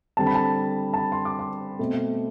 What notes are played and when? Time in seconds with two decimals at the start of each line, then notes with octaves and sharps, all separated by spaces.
0.17 D3 G3 C4 A5
0.27 B5
0.35 A5
0.94 A5
0.98 B5
1.12 C6
1.25 D6
1.39 C6
1.79 B2 A3 C4